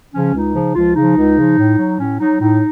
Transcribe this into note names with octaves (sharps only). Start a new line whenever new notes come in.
C#3 F3 C#4
C#2 D#4
C#3 F3
C#2 F3 F4
C#3 F3 D#4
C#2
C#3 F3
A2
F#3
A2 C#4
F#3 D#4
A2 D#4